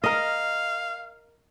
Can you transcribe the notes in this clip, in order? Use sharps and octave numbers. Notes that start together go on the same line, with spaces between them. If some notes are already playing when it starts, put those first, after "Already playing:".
A#4 D#5 F5